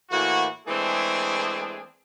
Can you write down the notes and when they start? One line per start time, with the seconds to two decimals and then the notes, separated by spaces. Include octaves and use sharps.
0.11 A2 E3 A#3 F#4
0.67 E3 G#3 A3 C4 D4 G#4